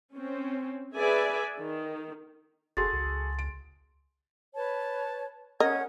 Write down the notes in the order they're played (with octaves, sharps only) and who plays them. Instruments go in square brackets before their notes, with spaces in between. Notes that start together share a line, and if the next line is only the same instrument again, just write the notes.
[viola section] C4 C#4
G#4 B4 D5 E5 G#5
D#3
[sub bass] G1 [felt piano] F#4 G#4 A4 [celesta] C6 A6
[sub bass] C#2
[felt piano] D7
[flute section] B4 C#5 A5
[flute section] C#4 F#5 G#6 [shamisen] A#4 D#5